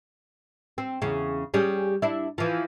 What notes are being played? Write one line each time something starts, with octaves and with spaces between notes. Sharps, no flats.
C4
E2 C#3
G3 C#4 G#4
D4 E4
E3 F3